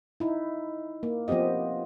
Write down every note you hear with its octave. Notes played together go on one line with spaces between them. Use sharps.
D#4 E4
A#3
F3 B3 C4 G4 D#5